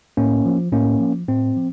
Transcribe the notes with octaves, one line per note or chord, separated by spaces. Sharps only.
A2 A#3 C#4
F3
A2 A#3 C#4
F3
A2 C4
F3